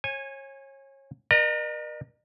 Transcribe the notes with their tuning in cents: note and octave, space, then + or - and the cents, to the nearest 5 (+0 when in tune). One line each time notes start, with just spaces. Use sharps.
C#5 -30 G#5 -10
A#4 +40 D#5 -45 A#5 +0